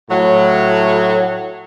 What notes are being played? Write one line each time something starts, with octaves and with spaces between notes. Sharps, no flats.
A2 F#3